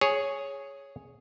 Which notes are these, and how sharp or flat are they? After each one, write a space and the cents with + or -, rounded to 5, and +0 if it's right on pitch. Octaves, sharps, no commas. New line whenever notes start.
G#4 +0 C#5 +0